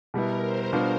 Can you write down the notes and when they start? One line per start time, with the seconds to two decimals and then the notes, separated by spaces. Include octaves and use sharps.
0.14 B2 G3 B3 E4 A#4
0.44 C5
0.72 B2 G3 B3 D4 F4